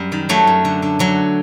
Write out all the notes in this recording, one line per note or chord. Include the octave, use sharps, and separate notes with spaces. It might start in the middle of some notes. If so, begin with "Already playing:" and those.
Already playing: F#2 G3
D#3
F#2 F#3 A3
F#2
D3
D3
D3 F#3